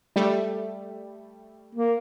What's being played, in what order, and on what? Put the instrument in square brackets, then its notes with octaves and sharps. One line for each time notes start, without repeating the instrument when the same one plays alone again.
[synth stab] G3 A3
[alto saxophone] A#3